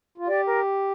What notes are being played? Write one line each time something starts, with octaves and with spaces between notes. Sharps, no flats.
F4
G4 D5
A#4